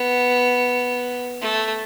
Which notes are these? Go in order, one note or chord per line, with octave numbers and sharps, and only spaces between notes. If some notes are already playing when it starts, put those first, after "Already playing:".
Already playing: B3
A3